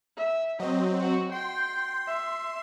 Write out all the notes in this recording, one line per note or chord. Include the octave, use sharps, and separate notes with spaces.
E5
F#3 C4 D#5
F#4
G5 C6
E5